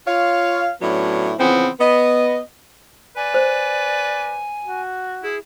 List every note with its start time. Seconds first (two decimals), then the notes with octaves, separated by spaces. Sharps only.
0.07 F4 C#5 F5
0.81 A2 F#3 B3 C#4 D4 E4
1.38 C#3 E3 F3 B3 C4
1.80 B3 D#5
3.17 B4 D5 G#5
3.34 C5
4.64 F#4
5.23 E4 G#4